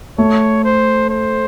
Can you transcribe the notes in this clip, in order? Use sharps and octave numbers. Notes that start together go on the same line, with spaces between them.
A3 C#5
C5
C5